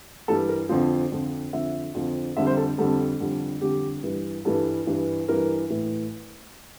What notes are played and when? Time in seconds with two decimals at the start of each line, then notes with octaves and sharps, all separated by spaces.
0.28 G2 E3 G3 A4
0.49 A#4
0.69 F2 D3 F3 C5
1.12 F2 D3 F3
1.53 F2 D3 F3 E5
1.95 F2 D3 F3
2.37 F2 D3 G3 E5
2.47 C5
2.57 A4
2.78 F2 D3 G3 A4
3.20 F2 D3 G3
3.61 F2 D3 G3 G4
4.03 G2 E3 G3
4.45 G2 E3 G3 A4
4.87 G2 E3 G3
5.28 G2 E3 G3 A#4
5.70 A2 E3